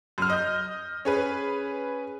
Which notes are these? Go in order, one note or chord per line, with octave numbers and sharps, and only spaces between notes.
F#2 F6
D#5 G6
C#4 G#4 B4